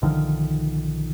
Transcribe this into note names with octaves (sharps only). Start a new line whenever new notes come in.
B1 D3 D#3 F3